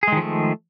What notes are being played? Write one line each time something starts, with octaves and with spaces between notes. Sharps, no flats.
D#3 F3 G#3 A3 G#4